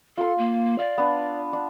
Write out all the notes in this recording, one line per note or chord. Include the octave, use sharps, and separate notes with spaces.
F4 A4 C6
A#3
D5 F5
B3 D4
D4